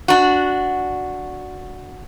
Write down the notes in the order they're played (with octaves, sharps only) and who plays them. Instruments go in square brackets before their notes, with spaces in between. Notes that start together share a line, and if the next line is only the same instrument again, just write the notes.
[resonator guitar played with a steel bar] D4 F#4